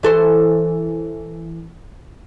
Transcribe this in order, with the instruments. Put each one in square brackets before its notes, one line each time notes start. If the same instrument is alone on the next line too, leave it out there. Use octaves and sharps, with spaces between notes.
[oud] E3 A4 C5